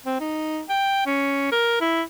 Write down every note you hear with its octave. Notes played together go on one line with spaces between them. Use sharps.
C4
D#4
G5
C#4
A#4
E4